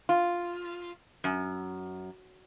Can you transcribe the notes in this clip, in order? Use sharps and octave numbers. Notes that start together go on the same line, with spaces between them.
F4
F#2